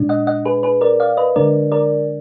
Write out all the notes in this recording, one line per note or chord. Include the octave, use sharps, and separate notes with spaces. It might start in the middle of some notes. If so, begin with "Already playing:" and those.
Already playing: A#2 G#3 D4
D#5 F#5
D#5 F#5
G#4 B4
G#4 B4
A#4 D5
D5 F5
B4 D#5
D3 G#3 D4 A#4 D5
A#4 D5